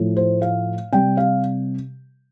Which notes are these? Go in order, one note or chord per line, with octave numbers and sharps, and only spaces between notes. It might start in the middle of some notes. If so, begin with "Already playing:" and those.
Already playing: A2 F3 A3
C5
F5
C3 G3 G5
F5